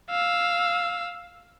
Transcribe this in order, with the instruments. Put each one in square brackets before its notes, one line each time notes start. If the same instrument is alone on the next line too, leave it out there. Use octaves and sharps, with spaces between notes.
[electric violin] F5 E6